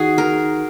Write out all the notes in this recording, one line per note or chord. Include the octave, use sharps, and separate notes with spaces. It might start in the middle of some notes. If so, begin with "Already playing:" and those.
Already playing: D#3 F#4 G#4
A#4